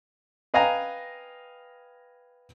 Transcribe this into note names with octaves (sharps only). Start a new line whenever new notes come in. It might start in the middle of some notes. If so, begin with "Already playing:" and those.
B4 D#5 F5 G5 G#5 A#5